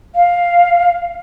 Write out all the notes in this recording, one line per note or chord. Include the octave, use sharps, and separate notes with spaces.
F5